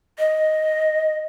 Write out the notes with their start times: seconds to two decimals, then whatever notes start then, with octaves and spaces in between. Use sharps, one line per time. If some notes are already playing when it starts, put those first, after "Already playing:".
0.19 D#5